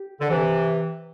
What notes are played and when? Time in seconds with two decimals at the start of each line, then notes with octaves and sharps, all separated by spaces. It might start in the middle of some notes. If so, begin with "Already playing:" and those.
Already playing: G4
0.20 D3
0.29 C3 E3